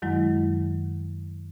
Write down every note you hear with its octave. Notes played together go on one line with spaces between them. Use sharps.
F#2 D#3 F#3 G#3 E4